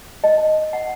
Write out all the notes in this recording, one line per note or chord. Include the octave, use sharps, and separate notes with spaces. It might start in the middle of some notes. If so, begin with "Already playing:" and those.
D#5
F#5